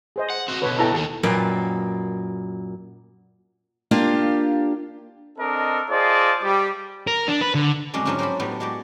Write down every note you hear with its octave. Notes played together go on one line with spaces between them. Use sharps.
G#4 C5 D#5
F#5
C4 F#4
B2 D3 B4 C#5
E4 A4 G5 A#5
D#2 D#3 A4
F#2 A#2 B4 D#5 F5 G5
A#3 D4 F4 G4 F5
C4 D4 A4 A#4 D#5
F4 G#4 C5 D5 D#5 A5
G3 D6
A#4
D4
B4
D3
F2 A2 F#3 G#3 C#4 D5
G#2 D3 F3 F#3 C4 C#4
A#3 C5 D#5 F#5 A5 B5
A2 F#3 G3 B3
G#3 F#4 G4 C#5 D5